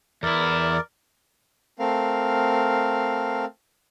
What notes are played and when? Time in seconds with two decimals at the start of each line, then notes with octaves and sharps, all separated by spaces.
0.23 E2 E4 A#4 D5
1.79 A3 C4 A#4 F5